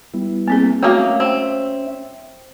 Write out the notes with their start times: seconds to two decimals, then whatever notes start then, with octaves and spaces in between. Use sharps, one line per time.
0.14 G3 B3 E4
0.48 A#3 C4 G#4
0.83 F#3 A3 A#3 C#4 F#4 E5
1.20 C4